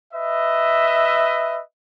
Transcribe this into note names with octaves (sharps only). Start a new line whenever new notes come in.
B4 D#5 E5